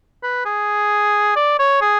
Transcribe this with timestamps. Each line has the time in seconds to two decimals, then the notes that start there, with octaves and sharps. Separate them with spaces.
0.23 B4
0.45 G#4
1.36 D5
1.59 C#5
1.82 G#4